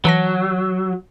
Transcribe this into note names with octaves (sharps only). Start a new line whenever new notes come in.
E3 F#3 A5 A#6